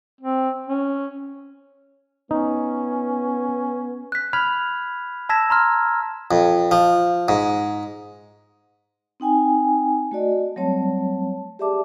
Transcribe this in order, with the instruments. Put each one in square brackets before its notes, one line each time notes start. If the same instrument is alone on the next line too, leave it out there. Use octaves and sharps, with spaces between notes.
[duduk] C4
C#4
[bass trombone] B3 [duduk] C#4 [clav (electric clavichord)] D#4
[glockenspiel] F#6 B6
B5 F6 G#6 B6 F7
A5 E6 G#6 A#6 B6 E7
A#5 C6 F6
[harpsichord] F2
F3
G#2
[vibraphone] C4 D#4 G5 G#5
A3 F#4 D5 D#5
F#3 G3 A3 C4 C#5 A5
G4 G#4 D5 E5 A5 D6